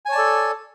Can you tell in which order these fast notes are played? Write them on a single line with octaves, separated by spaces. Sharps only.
G#5 C#5 A5 D5 A4